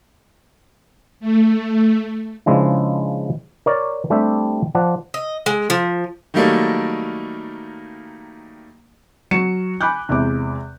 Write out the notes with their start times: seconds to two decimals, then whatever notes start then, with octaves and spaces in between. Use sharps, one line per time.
1.20 A3
2.46 C#3 F3 G#3 D4 E4
3.66 A#4 C#5 D5
4.10 G3 A3 C4 D4 G4 E5
4.75 F3 D5 F#5 A5
5.14 D#5
5.46 G#3
5.70 F3
6.34 D#3 F#3 G3 A3 A#3 D#4
9.31 F#3 F#4 C#7 E7
9.81 G#5 B5 D6 F#6 G6
10.09 E2 C3 G#3 E4 D6